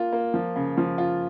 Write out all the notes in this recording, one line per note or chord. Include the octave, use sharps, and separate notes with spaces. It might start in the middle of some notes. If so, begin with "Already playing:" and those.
Already playing: A#3 F4
A#3
F3
C#3
F3
F4